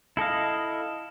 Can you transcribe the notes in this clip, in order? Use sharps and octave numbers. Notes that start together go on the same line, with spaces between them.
E4 A4 D#5 F5